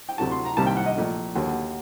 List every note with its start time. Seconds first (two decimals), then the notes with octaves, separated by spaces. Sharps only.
0.09 G5
0.18 D2 C3 F#3 A3 A5
0.31 C6
0.45 A#5
0.57 C2 C3 D#3 G3 A#3 A5
0.67 G5
0.77 F#5
0.86 D#5
0.97 A#1 A#2 A3
1.35 D#2 D3 F#3 A#3